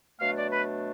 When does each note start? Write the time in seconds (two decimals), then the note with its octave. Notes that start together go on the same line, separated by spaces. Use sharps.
0.20 B2 F#3 A3 D4 F5
0.36 D5
0.50 B4